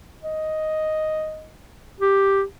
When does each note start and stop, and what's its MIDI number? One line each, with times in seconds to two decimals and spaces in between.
0.23 1.51 75
2.00 2.43 67